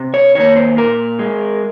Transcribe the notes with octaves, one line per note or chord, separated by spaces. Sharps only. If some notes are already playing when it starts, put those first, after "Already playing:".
Already playing: C3
C#5
D#3 A#3 C#5
C5
A#2 A#4
G#3